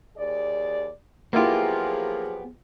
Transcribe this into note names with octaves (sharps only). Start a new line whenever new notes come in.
D#2 G#4 D5
F3 F#3 A#3 B3 E4 F4 G4 G#4